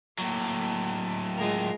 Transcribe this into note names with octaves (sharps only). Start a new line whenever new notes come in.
A2 F#3 A#3
G#3 F4 A#4